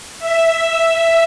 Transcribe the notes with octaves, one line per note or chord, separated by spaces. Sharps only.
E5